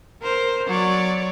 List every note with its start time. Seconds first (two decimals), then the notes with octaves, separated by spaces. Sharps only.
0.22 A#4 C5
0.67 F#3 C#5 D5